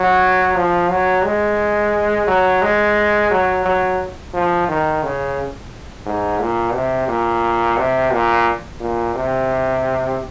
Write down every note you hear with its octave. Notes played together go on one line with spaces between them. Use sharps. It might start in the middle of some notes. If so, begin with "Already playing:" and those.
Already playing: F#3
F3
F#3
G#3
F#3
G#3
F#3
F#3
F3
D#3
C#3
G#2
A#2
C3
A#2
C3
A#2
A#2
C3